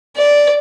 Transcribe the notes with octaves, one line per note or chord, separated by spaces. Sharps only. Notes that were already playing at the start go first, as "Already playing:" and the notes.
D5